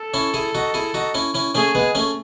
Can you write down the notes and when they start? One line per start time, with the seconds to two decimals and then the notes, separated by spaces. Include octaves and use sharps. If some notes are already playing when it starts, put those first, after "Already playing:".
Already playing: A4
0.14 C#4 E4
0.34 E4 G#4
0.55 D#4 F#4
0.74 E4 G#4
0.94 D#4 F#4
1.14 C#4 E4
1.34 C#4 E4
1.55 A3 C#4 G#4
1.75 G#3 B3
1.95 A3 C#4